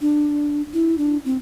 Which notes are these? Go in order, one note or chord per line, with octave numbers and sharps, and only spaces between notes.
D4
E4
D4
C4